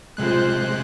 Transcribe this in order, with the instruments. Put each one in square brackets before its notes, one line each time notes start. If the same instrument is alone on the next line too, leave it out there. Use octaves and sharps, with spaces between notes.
[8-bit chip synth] C3 G#3 F#6 [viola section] F4 C5